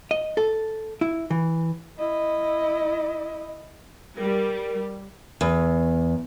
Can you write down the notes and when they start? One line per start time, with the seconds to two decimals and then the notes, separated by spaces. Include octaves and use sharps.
0.11 D#5
0.37 A4
1.01 E4
1.30 E3
1.99 E4 D#5
4.17 G3 A#4
5.41 E2